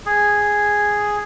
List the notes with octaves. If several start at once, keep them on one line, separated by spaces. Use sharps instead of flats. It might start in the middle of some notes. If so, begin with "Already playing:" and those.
G#4